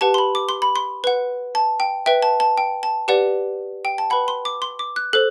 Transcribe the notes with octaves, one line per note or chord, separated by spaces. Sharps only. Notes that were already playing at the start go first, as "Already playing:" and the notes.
G4 B4 F#5 A5
C6
B5
D6
C6
B5
C6
B4 F#5
A5
G5
B4 E5 G5
A5
A5
G5
A5
G4 B4 D5 F#5
G5
A5
B4 F#5 B5
C6
D6
C6
D6
F#6
A4 C5 F#6